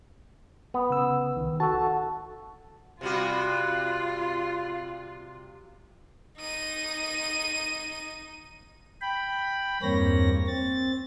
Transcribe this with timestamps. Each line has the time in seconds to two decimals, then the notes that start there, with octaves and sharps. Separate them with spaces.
0.74 B3
0.90 C#3 E6
1.36 C2 D#3
1.60 F#4 A4 A5
3.01 C3 G3 F4 F#4
6.38 D#4 D#7
9.02 G5 B5
9.82 E2 G2 A#3 C4 C#5 A#6
10.47 C4 A6